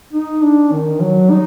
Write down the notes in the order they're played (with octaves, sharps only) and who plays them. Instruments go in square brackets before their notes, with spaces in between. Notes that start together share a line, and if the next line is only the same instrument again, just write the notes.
[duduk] D#4
D4
D#3
F#3
D#4